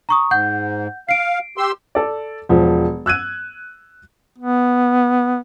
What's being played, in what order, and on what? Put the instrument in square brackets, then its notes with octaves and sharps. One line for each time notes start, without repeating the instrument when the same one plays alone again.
[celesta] A#5 C#6 D#6
[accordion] G#2 [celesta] F#5 G6
[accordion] F5 [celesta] C7 D7
[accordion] G4 C6 E6
[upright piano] A4 D5
E1 F3
E6 F#6 G#6 D#7
[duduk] B3